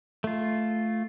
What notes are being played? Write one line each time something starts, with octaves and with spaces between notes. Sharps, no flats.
A3 F4